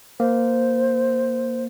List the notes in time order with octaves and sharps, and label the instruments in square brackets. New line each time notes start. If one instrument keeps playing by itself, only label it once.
[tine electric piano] A#3 [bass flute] C5